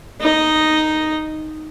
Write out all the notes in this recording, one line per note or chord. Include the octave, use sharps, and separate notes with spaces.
D#4 D#5